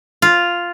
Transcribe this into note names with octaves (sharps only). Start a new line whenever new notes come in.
F4